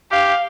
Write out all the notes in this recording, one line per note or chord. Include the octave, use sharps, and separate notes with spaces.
G4 F5